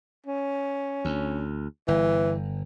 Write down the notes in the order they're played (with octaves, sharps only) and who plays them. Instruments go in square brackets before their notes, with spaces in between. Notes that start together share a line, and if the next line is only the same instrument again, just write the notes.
[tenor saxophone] C#4
[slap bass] D2
[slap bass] G1 [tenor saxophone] E3